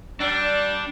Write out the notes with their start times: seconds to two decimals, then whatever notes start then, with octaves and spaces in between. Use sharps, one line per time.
0.20 G3 D4